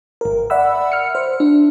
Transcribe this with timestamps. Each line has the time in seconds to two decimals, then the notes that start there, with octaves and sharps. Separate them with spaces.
0.21 G#1 A#4
0.50 D5 E5 F#5 B5 E6
0.92 F6 C#7
1.15 C5
1.40 D4